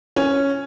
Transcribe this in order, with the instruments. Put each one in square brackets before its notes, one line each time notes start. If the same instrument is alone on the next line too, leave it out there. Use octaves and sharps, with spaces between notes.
[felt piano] C#4